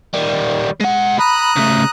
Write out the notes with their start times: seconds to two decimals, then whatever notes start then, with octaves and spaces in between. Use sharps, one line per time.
0.14 D#3 G3
0.81 G#3 F#5
1.20 A#5 B5 D#6 F#6
1.57 C#3 A3